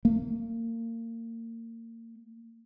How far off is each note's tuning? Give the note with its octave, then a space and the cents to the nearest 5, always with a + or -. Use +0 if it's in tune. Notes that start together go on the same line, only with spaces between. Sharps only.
A#3 -30